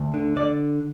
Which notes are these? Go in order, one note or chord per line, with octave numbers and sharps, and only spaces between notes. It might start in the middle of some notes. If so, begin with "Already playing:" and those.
Already playing: D2
D3
D3 D5